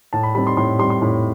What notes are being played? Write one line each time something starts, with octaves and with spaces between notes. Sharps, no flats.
A2 A5
B5
G3 C4 B5
C6
A2 C6
G3 C4 C6
C6
A2 C6